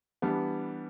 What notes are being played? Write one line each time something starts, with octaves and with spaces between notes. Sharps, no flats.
E3 G3 B3 D4